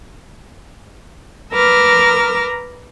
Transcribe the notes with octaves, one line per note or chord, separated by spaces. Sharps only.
A#4 B4 A#5 D6 E6 F6